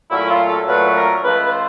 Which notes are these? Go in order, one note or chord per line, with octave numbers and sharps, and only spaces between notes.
A#2 F#3 A3 C#4 E4
F4
A4
A#2 F#3 A3 C#4 B4
A#4
C#2 C#3 F3 A3 B4
B4
C5